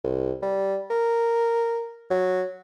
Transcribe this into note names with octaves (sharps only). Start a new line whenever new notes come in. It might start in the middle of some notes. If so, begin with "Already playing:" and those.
C2
G3
A#4
F#3